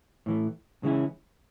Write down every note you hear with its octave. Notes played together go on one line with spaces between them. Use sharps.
A2 E3 A3
C#3 E3 G#3 C#4 E4